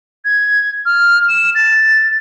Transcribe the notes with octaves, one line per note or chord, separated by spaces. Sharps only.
G#6
F6
E7
A6